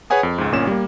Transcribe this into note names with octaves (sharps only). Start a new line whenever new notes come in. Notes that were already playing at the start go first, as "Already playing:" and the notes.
G#4 B4 C#5 F#5 G#5 D#6
F2
C#2 G#2
G1 A#2 C#4 E7
G3 A#3